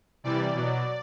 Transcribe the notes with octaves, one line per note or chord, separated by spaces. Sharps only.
C3 E3 G3 D5
B2 F#3